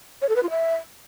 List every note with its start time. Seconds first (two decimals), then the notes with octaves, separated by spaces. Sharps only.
0.21 C#5
0.28 A4
0.35 B4
0.43 F4
0.50 E5